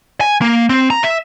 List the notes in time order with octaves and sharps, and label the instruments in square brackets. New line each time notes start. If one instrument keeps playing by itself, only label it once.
[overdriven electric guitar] G#5
A#3
C4
A#5
E5